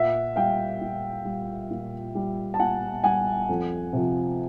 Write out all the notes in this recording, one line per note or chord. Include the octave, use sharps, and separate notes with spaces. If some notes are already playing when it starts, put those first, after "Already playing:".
Already playing: A#2 E5 F#5
G3 F5 G5
A#2
G3
A#2
G3
A5
A#2 F#5 G#5
G3 F#5 G#5
F2
C3 F3